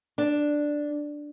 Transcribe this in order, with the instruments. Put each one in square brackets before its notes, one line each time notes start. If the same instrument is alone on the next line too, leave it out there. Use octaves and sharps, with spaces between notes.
[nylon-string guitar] D4